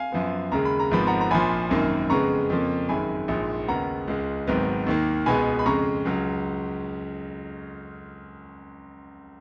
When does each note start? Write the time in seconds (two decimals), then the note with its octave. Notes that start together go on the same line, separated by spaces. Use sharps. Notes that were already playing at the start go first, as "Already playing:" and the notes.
Already playing: F5 G#5
0.12 F#2 F3 B3
0.52 D#2 C#3 G#3 A#5
0.65 B5
0.79 A#5
0.91 G#1 G#2 F3 B3 B5
1.07 F#5 A#5
1.21 A#5
1.31 A#1 A#2 F3 G#5 B5
1.70 G#1 F#2 D#3 A#3
2.10 F2 C#3 G#3 B3 A#5 C#6
2.50 F2 C#3 F3 A#3
2.89 G#1 F#2 D#3 G#3 G#5 B5
3.28 A#1 G#2 F3 G#3
3.68 D#2 C#3 G#3 B3 F#5 A#5
4.08 C#2 C#3 G#3
4.47 G#1 G#2 D#3 F#3 B3
4.86 D#2 D#3 A#3
5.26 C#2 B2 G#3 B3 G#5 B5
5.59 B5
5.66 F2 C#3 G#3 A#5 C#6
6.05 C#2 C#3 F#3